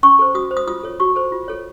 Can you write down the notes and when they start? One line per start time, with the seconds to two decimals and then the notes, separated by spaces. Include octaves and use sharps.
0.03 C#4 C#6
0.19 A4 C5
0.35 F#4 D#6
0.51 C5
0.57 D#6
0.67 F4 D#6
0.83 A4 C#5
1.00 F#4 C#6
1.16 A4 C5
1.32 F4
1.48 A4 C#5